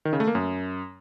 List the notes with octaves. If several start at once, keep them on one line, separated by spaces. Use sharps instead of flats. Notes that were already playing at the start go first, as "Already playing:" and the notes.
D#3
C#3
A3
A#3
F#2